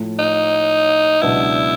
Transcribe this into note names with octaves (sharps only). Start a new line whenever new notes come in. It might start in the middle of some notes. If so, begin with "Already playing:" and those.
Already playing: A2 F3 A3
D#4
C#2 B2 F#3 B3 D4 E4